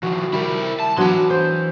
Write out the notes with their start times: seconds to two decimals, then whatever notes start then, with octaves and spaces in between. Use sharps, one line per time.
0.03 D#3 F3 F#4
0.33 G3 E4 A#4
0.80 A5
0.97 E3 F#3 B3 D4 C6
1.30 C5